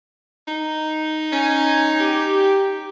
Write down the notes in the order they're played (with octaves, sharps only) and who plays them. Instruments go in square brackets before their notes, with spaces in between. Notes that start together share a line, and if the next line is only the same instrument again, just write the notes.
[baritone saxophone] D#4
[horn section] C#4 G#5
G4